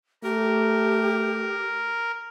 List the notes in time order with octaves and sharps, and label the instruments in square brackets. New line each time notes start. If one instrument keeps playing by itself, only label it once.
[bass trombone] A3 [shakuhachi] G4 [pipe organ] A#4